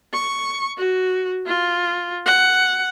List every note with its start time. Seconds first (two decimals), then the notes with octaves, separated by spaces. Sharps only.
0.14 C#6
0.78 F#4
1.47 F4
2.26 F#5